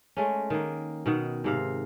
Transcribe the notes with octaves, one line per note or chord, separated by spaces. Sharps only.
G#3 A3 C#4
D#3 A#3
B2 D#3 F#5
G#2 C3 F5